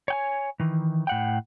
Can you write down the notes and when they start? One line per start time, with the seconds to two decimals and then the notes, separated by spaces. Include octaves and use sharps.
0.08 C#5 G5 G#5
0.60 D#3 E3
1.07 A2 F#5 G5